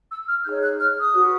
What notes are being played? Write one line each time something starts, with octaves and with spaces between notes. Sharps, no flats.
E6
F6
D#4 G#4 C#5 G6
F#6
F6
D#6
F#4 B4